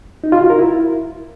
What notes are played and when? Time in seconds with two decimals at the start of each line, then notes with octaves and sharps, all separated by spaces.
0.24 D#4
0.32 F4
0.41 F#4
0.50 A#4
0.59 E4